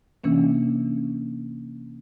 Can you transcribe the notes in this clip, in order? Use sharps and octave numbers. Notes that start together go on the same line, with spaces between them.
C3 E3 A#3 C#4 D4